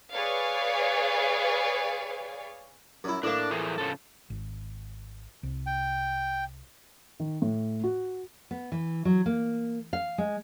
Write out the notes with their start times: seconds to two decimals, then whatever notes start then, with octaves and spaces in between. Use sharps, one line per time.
0.12 G#4 B4 C#5 D5 F5
3.04 F#2 E4
3.23 A2 A#3 D4
3.51 E3 F3 G#4
3.78 C#3 F3 A4
4.30 G#1
5.43 C2
5.67 G5
7.20 D#3
7.42 A2
7.84 F#4
8.51 B3
8.72 E3
9.05 F#3
9.26 A#3
9.93 F5
10.18 G#3